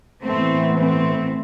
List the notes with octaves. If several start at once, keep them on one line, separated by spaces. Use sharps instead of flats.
A2 E3 A3 B3 C4
A3 C4